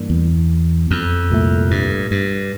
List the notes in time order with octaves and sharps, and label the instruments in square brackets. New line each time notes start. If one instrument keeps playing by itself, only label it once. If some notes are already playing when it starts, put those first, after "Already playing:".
Already playing: [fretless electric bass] G2 E3 A#3 D4
[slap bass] E2
F2
[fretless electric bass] C2 A#2 A3
[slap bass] G2
G2